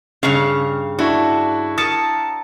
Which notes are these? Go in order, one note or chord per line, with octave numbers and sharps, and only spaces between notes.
G2 C#3 F5 A#5 C#6
D4 E4 F#4 C#6
A#4 A5 D#6 C#7